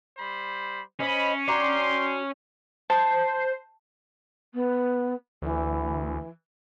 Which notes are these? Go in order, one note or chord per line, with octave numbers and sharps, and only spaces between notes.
G3 C5 B5
C#4 C5 D#5 B5
D4 F#4 G5 A#5 C6
C5 A5
B3
D2 E3